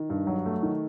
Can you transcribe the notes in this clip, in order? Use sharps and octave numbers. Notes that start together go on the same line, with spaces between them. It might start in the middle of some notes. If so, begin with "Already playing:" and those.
Already playing: D#3
G2
F#3
A3
D#3